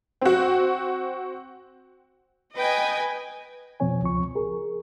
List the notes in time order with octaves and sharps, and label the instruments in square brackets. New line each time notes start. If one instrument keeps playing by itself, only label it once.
[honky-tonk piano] C4 F#4
[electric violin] B4 G#5 [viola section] D#5 G5
[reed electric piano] F2 B2 F3 C4 C#5 G#5
C#2 F3 C#6
G#4 A#4